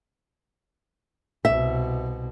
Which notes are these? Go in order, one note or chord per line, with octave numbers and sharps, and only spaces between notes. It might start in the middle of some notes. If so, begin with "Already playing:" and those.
C2 B2 E5